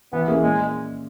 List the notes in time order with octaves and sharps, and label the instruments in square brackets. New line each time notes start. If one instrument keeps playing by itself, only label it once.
[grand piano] E3 [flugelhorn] B3
[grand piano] A#3 C#4 E4 G#4
[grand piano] A#2 [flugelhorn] G#3